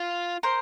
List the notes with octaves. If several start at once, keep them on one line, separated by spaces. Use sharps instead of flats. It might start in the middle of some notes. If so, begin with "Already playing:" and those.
Already playing: F4
A#4 C5